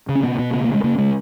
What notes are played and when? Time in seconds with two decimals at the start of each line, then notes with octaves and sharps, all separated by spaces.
0.09 C#3
0.15 C#4
0.23 B2 B3
0.39 B2 B3
0.53 C#3 B3
0.64 A#3
0.69 C#3
0.74 G#3
0.84 C#3 A#3
0.98 C#3 G#3